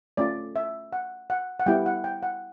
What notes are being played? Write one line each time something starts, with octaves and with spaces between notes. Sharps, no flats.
A3 C#4 F4 D5
E5
F#5
F#5
F#5
G3 B3 E4 G4 G5
F#5
G5
F#5